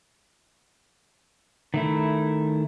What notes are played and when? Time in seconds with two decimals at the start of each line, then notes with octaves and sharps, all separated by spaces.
1.74 D#3 A3 E4